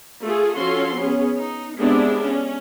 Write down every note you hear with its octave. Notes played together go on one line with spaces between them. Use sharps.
A3 F4 G#4 A4
F3 C#4 F4 F#4 A4 C6
B3 C#4 G#4
D#4
G#3 B3 C4 D4 E4 G4
C#4